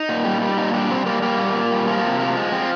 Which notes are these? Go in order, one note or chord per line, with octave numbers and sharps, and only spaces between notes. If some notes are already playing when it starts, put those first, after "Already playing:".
Already playing: D#4
A#2
G3
G3
A#2 D#4
G3 D4
G3 C4
G3 A#3
G3 A#3
A#2
A#2
G3
F3 A#3
C3
F3 A#3
G#3
F3 C4